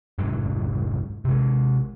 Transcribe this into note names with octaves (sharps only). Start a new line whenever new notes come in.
F1 G#2 F#3
C3 G#3